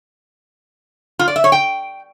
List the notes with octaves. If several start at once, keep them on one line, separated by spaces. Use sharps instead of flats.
F4
D5
E5
C#5
G5